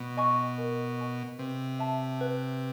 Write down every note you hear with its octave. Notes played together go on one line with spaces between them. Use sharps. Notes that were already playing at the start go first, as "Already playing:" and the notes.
Already playing: B2
D#5 G#5 C#6
A#4
D#5 G#5 C#6
C3 B4
E5 A5
B4